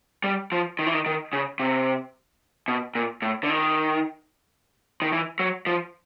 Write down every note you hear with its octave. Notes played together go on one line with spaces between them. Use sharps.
G3
F3
D#3
E3
D#3
D#3
C#3
C3
B2
A#2
A2
D3
D#3
D#3
E3
F#3
F3